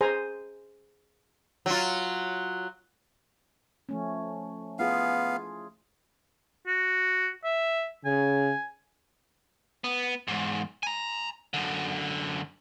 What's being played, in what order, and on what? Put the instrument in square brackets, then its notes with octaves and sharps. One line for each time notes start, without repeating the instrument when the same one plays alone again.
[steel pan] G#4 C5 G#5 A#5
[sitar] F#3 F4
[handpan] F3 A3 C#4
[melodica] B3 F5 [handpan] E4 F4 G#4
[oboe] F#4
E5
[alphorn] C#3 [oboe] G#5
[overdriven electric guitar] B3
E2 G#2
G#5 A#5
F#2 D3